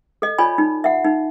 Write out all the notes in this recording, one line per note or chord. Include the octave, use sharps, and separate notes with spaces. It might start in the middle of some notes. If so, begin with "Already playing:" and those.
A4 D#5
F4 C#5 D5 G#5 B5
D#4
E5 F#5
D#4